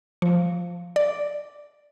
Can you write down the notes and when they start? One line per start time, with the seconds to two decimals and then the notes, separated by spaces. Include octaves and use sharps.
0.22 F3
0.96 D5